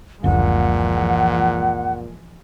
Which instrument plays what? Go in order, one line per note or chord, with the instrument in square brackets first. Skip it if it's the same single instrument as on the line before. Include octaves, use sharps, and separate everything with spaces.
[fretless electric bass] F#1 D2 [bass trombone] A#2 [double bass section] E3 F3 G#3 [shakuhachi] F#5